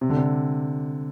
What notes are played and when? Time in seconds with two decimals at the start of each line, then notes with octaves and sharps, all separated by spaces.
0.01 C3
0.10 D3
0.17 C3